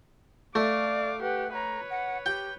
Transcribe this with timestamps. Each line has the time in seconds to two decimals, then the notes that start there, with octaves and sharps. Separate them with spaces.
0.55 A3 D5 F5 D6
1.22 G4 B4 F#5
1.53 B4 C#5 A#5
1.90 F#5
2.26 G4 G5